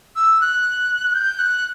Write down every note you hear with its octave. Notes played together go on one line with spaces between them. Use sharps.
E6
F#6
G6
F#6